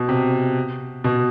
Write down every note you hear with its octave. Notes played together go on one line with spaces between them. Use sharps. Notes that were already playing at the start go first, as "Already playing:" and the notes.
Already playing: B2
C3
B2